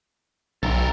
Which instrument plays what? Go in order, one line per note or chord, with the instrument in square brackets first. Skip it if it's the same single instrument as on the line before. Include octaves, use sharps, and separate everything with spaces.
[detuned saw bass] B1 [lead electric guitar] A4 A#4